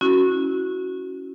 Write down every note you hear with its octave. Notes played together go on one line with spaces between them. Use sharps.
C#4 E4 F#4